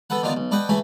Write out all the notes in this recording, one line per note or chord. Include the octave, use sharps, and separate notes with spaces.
B3 A4 B4 F#5
D3 D#3 B3 F4 D5
B1
D4 B4 D#5 F#5 G5
C#3 E3 A3 G#5 B5